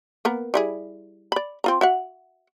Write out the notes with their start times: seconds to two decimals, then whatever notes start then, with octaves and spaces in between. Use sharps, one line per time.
0.25 A#3 B3 A#4
0.54 G3 E4 G#4
1.32 D5 B5
1.64 C4 F4 A#5
1.81 F#4 E5 F#5